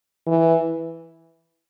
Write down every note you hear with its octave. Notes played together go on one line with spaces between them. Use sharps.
E3